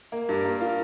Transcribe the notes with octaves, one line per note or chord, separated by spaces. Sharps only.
A#3
G2
A#3
F4